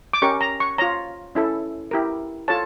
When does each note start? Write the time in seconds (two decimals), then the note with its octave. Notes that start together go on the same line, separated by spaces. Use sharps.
0.13 D6
0.22 C#4 G4 A#4 C#6
0.41 A#5
0.60 C#6
0.78 F4 C#5 A#5
1.35 C#4 E4 A4
1.91 E4 G4 A#4
2.48 F4 A4 C#5 A5